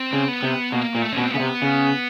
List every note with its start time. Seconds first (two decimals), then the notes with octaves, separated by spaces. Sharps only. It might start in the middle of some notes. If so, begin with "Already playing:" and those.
Already playing: C4
0.13 C#3
0.28 B3
0.43 C3
0.72 B2 A#3
0.95 A#2
1.02 A3
1.13 B2 C#4
1.23 C4
1.31 C#3 B3
1.40 C3
1.62 C#3